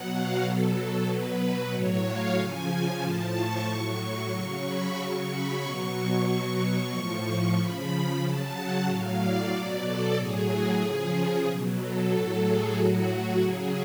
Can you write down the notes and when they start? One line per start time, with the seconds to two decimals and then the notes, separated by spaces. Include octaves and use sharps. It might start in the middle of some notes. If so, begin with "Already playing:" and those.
Already playing: B2 F#3 F#5
0.11 F5
0.43 B2 F#3 A4
0.76 A4
1.07 B2 F#3 B4
1.72 A2 F#3 C#5
2.05 F5
2.37 C#3 F3 G#5
3.02 A2 F3 A5
3.34 C#6
3.68 A2 F#3
4.32 C#3 F#3 C#6
4.65 B5
4.96 C#3 F#3 C#6
5.29 B5
5.61 B2 F#3 C#6
6.26 B2 F#3
6.91 A2 F3
7.56 C#3 F3 B5
8.21 C#3 F#3 A5
8.54 F#5
8.86 A2 F#3 F5
9.18 D5
9.50 B2 F#3 D5
9.83 A4
10.16 A2 F#3 G#4
10.81 C#3 F3 G#4
11.46 B2 F#3
11.78 A4
12.10 A2 F#3 A4
12.43 G#4
12.75 A2 F#3 F#4
13.08 F#4
13.40 C#3 F#3 G#4